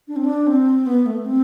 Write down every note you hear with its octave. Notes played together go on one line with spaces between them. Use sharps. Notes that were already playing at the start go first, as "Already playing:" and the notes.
D4
C4
D4
C4
B3
A3
C4